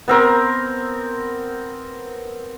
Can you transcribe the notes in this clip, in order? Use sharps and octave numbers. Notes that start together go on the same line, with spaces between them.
B3 C4 A#4